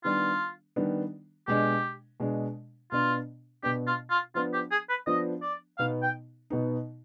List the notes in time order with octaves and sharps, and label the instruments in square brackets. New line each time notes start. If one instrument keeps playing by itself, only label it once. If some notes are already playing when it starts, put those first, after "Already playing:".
[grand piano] D#3 G3 B3 D4 [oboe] F4
[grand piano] D#3 G3 B3 D4
[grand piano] B2 G#3 D4 [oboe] G4
[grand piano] B2 G#3 D4
[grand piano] B2 B3 D4 [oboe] F4
[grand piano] B2 B3 D4 [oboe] G4
[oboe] F4
F4
[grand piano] F3 B3 D4 [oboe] F4
[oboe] G4
G#4
B4
[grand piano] F3 B3 D4 [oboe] D#5
[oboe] D5
[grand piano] B2 B3 D#4 [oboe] F5
[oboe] G5
[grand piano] B2 B3 D#4